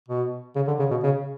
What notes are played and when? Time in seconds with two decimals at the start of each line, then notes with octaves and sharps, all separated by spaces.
0.08 B2
0.56 C#3
0.67 D3
0.79 C#3
0.91 B2
1.03 C#3